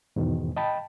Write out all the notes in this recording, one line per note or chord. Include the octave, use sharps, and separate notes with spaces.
E2 G#2 B2 D#3
D#5 G5 A5 B5